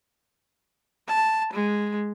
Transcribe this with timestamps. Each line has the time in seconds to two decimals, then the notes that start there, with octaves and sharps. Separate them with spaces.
1.08 A5
1.53 G#3